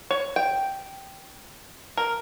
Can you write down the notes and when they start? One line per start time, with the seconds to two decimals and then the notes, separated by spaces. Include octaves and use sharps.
0.11 C#5
0.36 G5
1.97 A#4